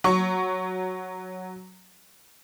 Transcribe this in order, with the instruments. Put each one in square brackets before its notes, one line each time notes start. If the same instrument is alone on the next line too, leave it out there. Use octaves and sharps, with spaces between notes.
[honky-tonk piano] F#3 C#6